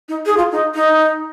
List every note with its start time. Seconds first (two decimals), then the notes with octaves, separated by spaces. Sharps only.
0.09 D#4
0.26 G#4
0.37 F4
0.52 D#4
0.75 D#4